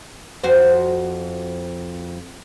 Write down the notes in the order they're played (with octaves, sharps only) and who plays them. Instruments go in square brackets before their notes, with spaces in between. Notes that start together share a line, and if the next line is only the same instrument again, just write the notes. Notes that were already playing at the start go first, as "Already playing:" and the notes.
[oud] F2 F#4 C5